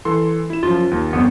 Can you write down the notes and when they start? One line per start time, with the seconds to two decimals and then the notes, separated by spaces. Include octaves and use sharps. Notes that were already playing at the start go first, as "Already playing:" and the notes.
0.05 E3 A4 C6
0.50 E4 E7
0.63 F#2 F3 F4
0.91 D#2
1.13 G1 F2 B3